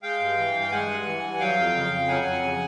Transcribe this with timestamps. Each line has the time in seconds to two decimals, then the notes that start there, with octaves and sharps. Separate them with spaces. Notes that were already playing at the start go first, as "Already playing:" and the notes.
0.03 G#3 F5 G5
0.20 G2
0.38 E3
0.54 G2
0.60 G5
0.71 G#3 F#5 G#5
0.89 G2
1.06 E3
1.23 G2
1.40 F#3 F5 G5
1.57 F2
1.74 C#3
1.91 F2
2.08 F#3 F#5 G#5
2.26 F2
2.42 C#3